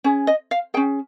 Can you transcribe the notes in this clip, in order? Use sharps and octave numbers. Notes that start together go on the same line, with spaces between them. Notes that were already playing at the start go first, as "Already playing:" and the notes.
C#4 G#4
D#5
F5
C#4 G#4 G5